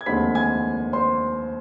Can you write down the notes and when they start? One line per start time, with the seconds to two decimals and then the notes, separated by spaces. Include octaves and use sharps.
0.01 G#6
0.06 F1 D#2 D3 G#3 C4 B5 B6
0.35 G#5 G#6
0.93 C5 C6